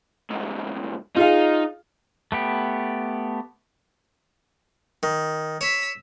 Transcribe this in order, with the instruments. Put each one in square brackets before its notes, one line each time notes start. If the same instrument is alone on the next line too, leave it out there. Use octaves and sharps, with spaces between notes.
[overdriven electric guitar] C2 G#2
[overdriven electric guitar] D#4 [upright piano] F4 G#4 F5
[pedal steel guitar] A3 B3 G4
[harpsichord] D#3
[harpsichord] C#5 [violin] E6 B6